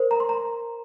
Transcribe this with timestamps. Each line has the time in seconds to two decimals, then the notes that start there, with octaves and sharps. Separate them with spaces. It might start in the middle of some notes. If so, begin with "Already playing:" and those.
Already playing: A#4 C5
0.11 A#5
0.20 C6
0.29 A#5